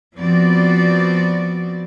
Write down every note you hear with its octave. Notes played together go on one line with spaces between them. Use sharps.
F3 B3 C4 F#4 D5